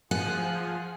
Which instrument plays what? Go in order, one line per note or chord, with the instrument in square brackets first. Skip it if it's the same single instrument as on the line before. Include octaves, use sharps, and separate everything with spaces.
[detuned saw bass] F3 [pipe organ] F4 G#4 [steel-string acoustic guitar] F#5 [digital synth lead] G#5